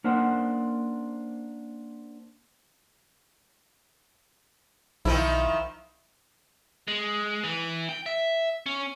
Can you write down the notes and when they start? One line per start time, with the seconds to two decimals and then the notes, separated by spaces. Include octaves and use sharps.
0.04 A#3 C#4 D4 C5 F#5
5.05 B1 D#3 F3 E4
6.88 G#3
7.44 E3
7.89 G5
8.06 E5
8.66 C#4